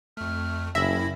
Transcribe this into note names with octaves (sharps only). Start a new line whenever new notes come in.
F2 A3 F6
F#1 F#2 E4 E5 B5 A#6